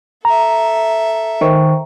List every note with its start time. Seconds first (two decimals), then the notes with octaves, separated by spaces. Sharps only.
0.25 A4 E5 A#5
1.41 D#3 C5 G5 C#6